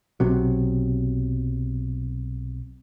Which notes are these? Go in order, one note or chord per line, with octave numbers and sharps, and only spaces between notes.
B1 C3 F#3